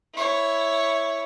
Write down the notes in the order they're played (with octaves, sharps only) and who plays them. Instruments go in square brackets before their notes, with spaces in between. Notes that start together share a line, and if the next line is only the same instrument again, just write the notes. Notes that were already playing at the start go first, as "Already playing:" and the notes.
[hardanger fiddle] E4 C#5